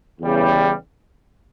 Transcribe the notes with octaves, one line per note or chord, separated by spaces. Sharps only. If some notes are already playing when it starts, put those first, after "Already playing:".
E2 C#3 G3